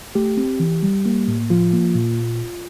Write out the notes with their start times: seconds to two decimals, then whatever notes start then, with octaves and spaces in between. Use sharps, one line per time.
0.15 A3 G4
0.37 C4
0.60 E3
0.83 G3
1.06 A#3
1.28 A2
1.50 F3 F4
1.73 A#3
1.95 A#2